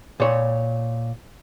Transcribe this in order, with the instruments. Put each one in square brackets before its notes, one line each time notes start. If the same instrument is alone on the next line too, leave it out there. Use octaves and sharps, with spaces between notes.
[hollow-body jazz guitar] A#2 C#5